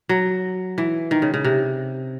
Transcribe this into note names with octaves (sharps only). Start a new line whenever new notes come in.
F#3
E3
D#3
C#3
C#3
C3